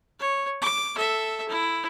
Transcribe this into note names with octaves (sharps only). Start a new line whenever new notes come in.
C#5
D6
A4 E5
E4